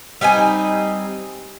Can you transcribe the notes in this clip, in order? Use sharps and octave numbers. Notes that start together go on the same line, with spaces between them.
G3 C4 D#4 G#5